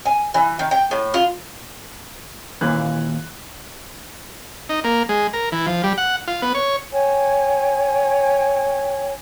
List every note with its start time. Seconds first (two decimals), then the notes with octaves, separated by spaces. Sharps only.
0.05 G#5
0.34 E3
0.59 D#3
0.71 G5
0.91 A2
1.14 F4
2.61 D#2 A#2 E3 F#6
4.69 D#4
4.84 A#3
5.09 G#3
5.33 A#4
5.52 E3
5.67 F3
5.84 G3
5.98 F#5
6.28 F4
6.42 B3
6.55 C#5
6.93 C#5 G5 G#5